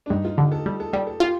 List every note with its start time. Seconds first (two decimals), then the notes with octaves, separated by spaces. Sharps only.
0.06 D4
0.10 G2 D#4
0.25 F4
0.37 D3 G4
0.52 A4
0.66 G3
0.80 A4
0.93 G3 G4
1.07 A4
1.20 F4 G4